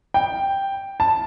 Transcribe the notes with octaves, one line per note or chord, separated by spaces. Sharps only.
G5
A5